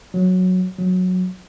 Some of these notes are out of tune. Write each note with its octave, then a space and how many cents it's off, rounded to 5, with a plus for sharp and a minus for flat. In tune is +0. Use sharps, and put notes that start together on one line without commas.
F#3 -10
F#3 -15